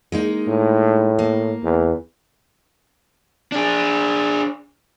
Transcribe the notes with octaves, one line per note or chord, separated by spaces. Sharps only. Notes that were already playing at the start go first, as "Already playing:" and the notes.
G#3 A#3 D#4
A2
A#3
E2
D4 G#4